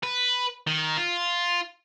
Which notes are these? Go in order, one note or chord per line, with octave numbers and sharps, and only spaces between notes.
B4
D#3
F4